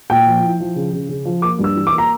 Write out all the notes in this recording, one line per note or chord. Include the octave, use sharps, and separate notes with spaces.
A#2 G5
F3
E4
F3
C#3
C#3
C#3
F3
A#3 D6
G2
E6
E3
D6
A#3
A#5